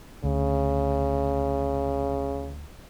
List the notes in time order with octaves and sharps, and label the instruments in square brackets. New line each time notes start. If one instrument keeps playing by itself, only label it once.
[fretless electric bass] D2 [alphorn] C#3